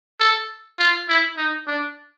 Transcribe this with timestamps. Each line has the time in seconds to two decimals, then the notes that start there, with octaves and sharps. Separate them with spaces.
0.20 A4
0.79 F4
1.09 E4
1.37 D#4
1.67 D4